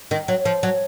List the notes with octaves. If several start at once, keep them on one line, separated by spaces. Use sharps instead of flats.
D#3
F#3
F3
F#3